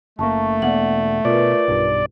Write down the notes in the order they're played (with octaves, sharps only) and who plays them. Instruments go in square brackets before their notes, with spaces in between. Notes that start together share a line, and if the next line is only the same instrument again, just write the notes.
[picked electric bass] F#1 A#3 [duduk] A3 [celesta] A5 C#6
[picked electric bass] E1 A#3 B3 [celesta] D5 F#5 F#7
[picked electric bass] B2 [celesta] F4 A#4 B4 [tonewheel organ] D5
[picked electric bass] B1 G2